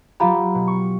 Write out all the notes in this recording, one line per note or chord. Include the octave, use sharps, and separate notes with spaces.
F#3 F4 G4 F5 A#5 B5
B2
C#6